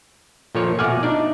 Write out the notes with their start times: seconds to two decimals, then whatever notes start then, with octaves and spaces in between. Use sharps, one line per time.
0.55 A#2 F3 A4 C#5
0.79 B2 E5 F#5 G#5 D6 F6
1.03 D4 D#4 D5